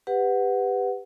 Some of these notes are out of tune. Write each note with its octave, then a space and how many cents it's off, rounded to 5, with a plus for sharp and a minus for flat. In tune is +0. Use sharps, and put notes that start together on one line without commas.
G4 +20 B4 +15 F#5 +0